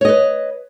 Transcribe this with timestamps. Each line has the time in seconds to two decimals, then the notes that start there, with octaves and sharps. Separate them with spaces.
0.01 C#5
0.05 D#5
0.08 B4